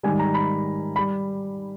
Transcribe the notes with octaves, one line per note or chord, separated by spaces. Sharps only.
G#2 D#3 G3 G#5
A#5
B5
G3 B5